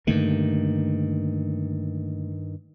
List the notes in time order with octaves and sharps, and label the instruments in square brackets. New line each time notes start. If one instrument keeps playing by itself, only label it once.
[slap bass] G2 D#3 [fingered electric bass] D3 A3 A#3